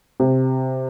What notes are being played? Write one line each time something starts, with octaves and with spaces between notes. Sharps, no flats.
C3